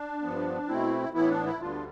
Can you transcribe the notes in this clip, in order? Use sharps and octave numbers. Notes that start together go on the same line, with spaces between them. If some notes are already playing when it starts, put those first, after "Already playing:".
Already playing: D4
G2 F3 B3
B2 A3 C4 E4
A2 E3 B3 E4
D4
E4
D2 D3 G3 B3 D4 F4